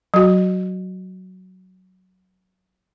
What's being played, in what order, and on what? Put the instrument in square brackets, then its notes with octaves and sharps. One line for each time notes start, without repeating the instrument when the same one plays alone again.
[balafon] F#3 F#4